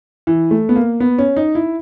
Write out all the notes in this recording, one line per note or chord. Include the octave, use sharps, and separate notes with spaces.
E3
A3
B3
A#3
B3
C#4
D#4
E4